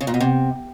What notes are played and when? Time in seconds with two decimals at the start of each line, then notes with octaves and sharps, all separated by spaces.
0.01 C#3
0.07 A#2
0.14 B2
0.20 C3